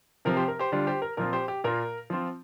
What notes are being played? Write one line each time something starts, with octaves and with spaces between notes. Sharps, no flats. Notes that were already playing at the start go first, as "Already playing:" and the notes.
C3 F3 C4 A#4
G4 C5
A#4
G4 C5
D3 G3 D4 F4
G4 C5
A#4
A#2 F3 C4 F4 A#4
G4 C5
G4
A#2 A#3 F4 A#4
F3 C4 F4